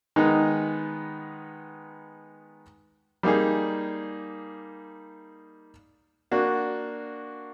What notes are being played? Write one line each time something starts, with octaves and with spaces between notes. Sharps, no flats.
D#3 G#3 B3 D#4
G3 A#3 D#4 G#4
A#3 D4 F#4